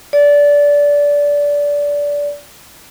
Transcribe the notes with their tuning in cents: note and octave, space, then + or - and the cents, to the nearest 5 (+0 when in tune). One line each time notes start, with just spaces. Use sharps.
D5 -20